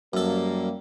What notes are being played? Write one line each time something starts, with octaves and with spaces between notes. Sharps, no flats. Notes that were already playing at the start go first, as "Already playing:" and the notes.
F#2 G3 A#3 A4